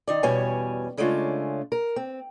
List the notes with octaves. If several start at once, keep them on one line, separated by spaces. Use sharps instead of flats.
D#3 D#4 D5
E2 B2 G3 C#4 C#5 G#5
C#3 G#3 A3 C#4 D4 F4
A#4
C4